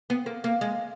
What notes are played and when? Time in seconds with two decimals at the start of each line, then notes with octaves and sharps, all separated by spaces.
0.10 B3
0.26 A#3
0.44 A#3
0.61 G#3